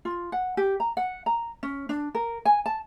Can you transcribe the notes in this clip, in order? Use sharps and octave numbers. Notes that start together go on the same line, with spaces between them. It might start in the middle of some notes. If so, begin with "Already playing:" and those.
F4
F#5
G4
A#5
F#5
A#5
C#4
D4
A#4
G#5
A5